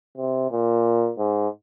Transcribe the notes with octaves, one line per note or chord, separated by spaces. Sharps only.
C3
A#2
G#2